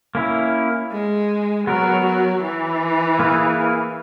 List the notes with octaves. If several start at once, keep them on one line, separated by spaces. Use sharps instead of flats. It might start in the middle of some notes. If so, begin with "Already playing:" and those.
A#3 C#4 E4
G#3
F#3 B3 F#4 A#4
F#3
E3
A#3 E4 G#4 B4